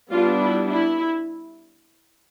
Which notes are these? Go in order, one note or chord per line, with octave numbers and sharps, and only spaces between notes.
G3 B3 D4 F4
E4
E4